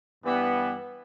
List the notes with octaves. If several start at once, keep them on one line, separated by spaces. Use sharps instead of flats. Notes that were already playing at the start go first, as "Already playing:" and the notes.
G2 E3 G3 B3